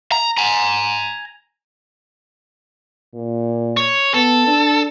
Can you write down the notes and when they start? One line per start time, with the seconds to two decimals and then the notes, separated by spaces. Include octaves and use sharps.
0.12 A#5
0.38 G#5 A#5
3.14 A#2
3.77 C#5
4.14 B3 A4
4.47 D4